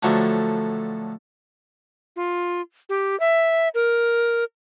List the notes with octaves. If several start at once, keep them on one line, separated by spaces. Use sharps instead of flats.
A2 D3 F3 F#3 A3
F4
G4
E5
A#4